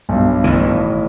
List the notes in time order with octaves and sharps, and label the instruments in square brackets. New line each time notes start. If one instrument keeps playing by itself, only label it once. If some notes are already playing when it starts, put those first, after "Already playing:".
[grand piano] B1 G2
[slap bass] A1 D#3 E3